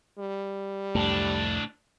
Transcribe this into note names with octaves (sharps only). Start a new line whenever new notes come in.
G3
C2 F2 A2 A3 D4